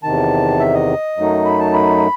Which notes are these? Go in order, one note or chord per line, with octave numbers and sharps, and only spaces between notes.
E2 C3 D#3 A5
E5
D#5
F#2 F#3 A3 D#4
B5
A5
B5